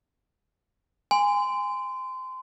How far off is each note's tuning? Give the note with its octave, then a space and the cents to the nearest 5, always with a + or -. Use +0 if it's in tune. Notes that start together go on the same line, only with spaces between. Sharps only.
G#5 -20 C6 -25